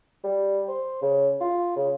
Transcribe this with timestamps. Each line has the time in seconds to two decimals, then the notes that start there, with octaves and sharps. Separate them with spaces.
0.24 G3
0.68 C5
1.02 C#3
1.41 F4
1.76 C#3